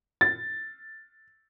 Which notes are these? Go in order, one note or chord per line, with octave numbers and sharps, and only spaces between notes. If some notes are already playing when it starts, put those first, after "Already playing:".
A6